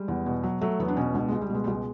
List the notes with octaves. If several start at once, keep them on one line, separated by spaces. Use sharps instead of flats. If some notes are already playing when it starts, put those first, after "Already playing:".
Already playing: G3 G#3
E2
B2
F#3
F#3 A3
E2 B3
D4
B2 C#4
C#2 D4
C#2 G#3
G3
B2 G#3
G3
C#2 G#3